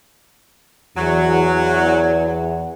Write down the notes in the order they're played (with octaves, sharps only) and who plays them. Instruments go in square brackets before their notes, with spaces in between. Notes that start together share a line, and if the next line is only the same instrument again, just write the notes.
[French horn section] E2 [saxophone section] F#3